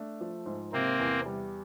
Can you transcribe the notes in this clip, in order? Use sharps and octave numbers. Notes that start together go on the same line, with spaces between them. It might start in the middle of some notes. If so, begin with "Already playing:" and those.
Already playing: A3 D4
F3
G#2
C3 A#3 C4
E2
G3